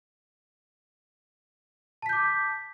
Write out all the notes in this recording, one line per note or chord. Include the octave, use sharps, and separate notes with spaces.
A5 D6 G6 B6